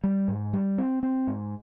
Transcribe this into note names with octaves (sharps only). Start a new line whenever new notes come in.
G3
G#2
G3
C4
C4
G#2